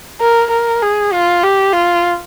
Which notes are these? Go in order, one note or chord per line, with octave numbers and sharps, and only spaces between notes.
A#4
A#4
G#4
F4
G4
F4